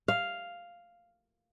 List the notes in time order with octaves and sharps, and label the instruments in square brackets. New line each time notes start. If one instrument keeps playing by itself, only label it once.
[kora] F5